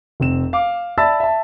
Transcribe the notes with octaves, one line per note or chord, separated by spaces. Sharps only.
F1 C4 E7
F5 D6
D5 E5 A5 B5 E6 A6
E5 A5